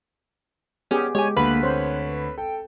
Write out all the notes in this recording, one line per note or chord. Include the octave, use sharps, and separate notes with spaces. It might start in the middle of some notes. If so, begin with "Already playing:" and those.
B3 C#4 G4 G#4
G#3 G4 C#5 G#5
D2 A#3 B4 B5
C4 C5 C#5
A4 G5